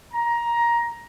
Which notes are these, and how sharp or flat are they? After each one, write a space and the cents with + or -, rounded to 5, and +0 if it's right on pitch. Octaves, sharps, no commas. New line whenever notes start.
A#5 +15